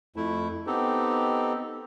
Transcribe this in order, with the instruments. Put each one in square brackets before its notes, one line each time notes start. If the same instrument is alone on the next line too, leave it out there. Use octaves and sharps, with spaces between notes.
[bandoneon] F2 A3 E4
B3 C4 D#4 G4 A4